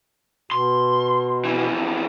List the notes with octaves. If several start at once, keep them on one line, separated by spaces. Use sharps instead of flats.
B2 C6
F2 E3